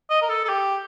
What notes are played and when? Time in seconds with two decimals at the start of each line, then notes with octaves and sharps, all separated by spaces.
0.10 D#5
0.22 A#4
0.29 A4
0.45 A4
0.49 G4